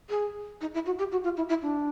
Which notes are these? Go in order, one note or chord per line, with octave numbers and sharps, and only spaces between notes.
G#4
D#4
E4
F#4
G4
F#4
F4
E4
E4
D4